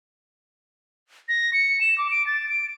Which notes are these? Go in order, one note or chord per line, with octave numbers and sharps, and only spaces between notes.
A#6
C#7
E7
D6
D7
A6
D7